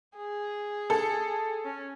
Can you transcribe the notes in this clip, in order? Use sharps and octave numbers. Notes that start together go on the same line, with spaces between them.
G#4
A4
C#4